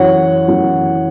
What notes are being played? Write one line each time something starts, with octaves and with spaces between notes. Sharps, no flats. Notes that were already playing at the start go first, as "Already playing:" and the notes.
Already playing: F#2 E3 C#5 F#5
F#2 E3